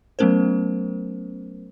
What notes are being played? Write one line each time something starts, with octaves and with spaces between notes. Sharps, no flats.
F#3 A3 B3 C#4 A#4 C5